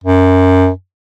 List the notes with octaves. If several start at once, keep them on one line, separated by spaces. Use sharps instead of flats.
F#2